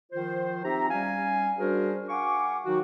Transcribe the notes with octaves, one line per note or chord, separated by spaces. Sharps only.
D#3 F3 F4 C5
C4 D#4 G4 E5 A#5
G3 C#4 F5 G#5
G3 D4 F#4 G#4 A#4 C5
F5 F#5 G#5 C#6 D6
D#3 F#3 D#4 F#4